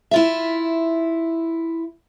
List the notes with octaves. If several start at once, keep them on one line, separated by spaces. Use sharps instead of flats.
E4 F4 E5